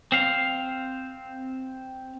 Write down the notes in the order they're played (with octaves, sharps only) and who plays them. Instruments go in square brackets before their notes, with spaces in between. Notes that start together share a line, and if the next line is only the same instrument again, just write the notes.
[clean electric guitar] C4 F5